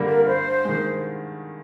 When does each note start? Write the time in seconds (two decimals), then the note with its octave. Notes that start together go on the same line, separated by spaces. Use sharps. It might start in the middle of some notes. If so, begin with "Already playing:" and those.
Already playing: G2 D3 G3 A#3
0.08 A#4
0.26 G2 C5
0.65 D#3 G#3